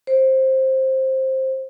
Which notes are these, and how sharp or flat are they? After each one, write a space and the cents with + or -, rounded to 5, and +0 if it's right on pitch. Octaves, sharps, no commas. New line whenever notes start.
C5 +15